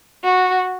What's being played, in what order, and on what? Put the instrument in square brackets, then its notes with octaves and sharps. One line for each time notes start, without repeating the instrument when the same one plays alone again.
[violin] F#4